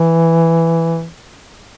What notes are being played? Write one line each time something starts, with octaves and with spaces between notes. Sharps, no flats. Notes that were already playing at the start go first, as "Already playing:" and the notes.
Already playing: E3